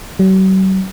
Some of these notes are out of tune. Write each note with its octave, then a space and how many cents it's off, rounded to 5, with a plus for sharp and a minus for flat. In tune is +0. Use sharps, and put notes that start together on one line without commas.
F#3 +45